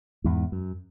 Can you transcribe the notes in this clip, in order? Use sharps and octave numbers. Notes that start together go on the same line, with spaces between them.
E2 G#2
F#2